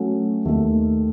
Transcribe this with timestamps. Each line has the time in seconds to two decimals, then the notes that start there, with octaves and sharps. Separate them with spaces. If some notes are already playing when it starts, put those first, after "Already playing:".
Already playing: F#3 A3 C#4 F#4
0.45 D#2 D#3 A3